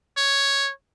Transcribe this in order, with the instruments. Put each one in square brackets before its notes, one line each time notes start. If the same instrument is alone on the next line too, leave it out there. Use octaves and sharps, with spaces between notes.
[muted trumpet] C#5